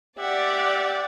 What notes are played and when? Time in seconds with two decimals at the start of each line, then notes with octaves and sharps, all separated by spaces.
0.19 G4 D5 E5 F#5